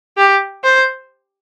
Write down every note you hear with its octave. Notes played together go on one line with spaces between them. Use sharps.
G4
C5